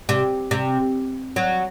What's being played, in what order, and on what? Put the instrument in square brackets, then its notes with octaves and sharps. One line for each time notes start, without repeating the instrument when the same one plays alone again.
[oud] C3
C3
F#3